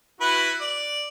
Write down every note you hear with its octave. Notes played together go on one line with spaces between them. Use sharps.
E4 F#4 B4
D5